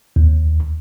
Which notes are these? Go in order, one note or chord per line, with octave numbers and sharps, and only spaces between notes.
D#2